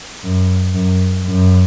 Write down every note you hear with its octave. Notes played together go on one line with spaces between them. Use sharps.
F#2
F#2
F#2